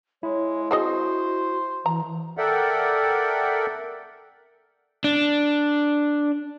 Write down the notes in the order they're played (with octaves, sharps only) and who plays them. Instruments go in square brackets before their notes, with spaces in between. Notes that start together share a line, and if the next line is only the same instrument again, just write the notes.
[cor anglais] G#3 [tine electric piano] E4 [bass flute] C#5
[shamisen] C4 G#4 D#5 [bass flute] F#4 [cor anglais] C5
[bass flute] E3 [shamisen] A#5
[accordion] A4 A#4 D5 E5 F#5 G5
[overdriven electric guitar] D4